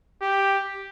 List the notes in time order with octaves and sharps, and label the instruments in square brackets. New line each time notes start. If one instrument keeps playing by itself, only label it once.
[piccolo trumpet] G4